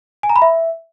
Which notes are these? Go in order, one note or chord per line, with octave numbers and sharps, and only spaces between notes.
G#5
A#5
B5
E5